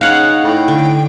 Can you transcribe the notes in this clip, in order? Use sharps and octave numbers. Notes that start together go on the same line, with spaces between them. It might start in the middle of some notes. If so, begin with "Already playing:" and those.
C#3 D#4 C#5 F5 F#5 F#6
A2 G5
D3